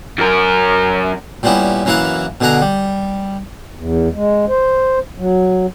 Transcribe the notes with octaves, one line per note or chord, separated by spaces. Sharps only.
F#2 A#4
A#2 G3 B3 C#4 E4
F#2 E3 A#3 E4 F5 F#5
B2 D3 G#4 F#5 A#5
G3
E2
G#3
C5
F#3